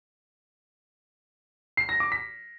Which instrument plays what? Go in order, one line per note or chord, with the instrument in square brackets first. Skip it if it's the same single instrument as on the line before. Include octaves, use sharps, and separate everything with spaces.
[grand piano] C7
A#6
D6
B6